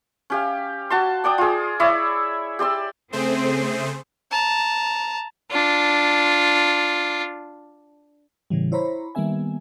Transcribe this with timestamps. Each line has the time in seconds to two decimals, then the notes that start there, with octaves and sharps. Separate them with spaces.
0.30 C#4 G4 F5
0.90 F#4 A5 C6
1.24 D5 G5 D6 D#6
1.38 F4 G#4
1.80 E4 C#5 D5 E5
2.59 G4 D5 C6 E6
3.12 C#3 A3 C4 G#4 C5
4.31 A5 A#5
5.51 D4 F4
8.50 A2 C#3 E3 G3
8.72 E4 C5 C#5 A#5 B5
9.15 D#3 G3 A#3 B3 E5 G#5